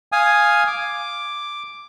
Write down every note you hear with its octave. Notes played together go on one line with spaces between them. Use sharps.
F5 G#5 D#6
D6